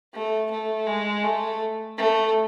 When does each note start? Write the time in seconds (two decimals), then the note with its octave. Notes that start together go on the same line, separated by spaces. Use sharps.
0.14 A3
0.51 A3
0.87 G#3
1.24 A3
1.98 A3